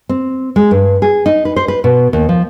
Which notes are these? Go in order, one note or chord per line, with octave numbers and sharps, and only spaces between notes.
C4
G#3
G2
G#4
D#4
B4
C5
B4
B2
D#2
F3